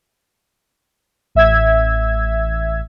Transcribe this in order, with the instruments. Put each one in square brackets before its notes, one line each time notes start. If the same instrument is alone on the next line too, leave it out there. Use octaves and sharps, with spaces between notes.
[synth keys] A1 E5 E6 G#6